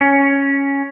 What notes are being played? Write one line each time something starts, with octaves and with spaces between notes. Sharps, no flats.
C#4